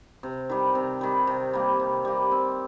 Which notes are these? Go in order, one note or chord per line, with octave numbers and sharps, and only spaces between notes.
C3
D#3 G3
C3
D#3 G3
C3
G3 A#3
C3
G3 A#3
C4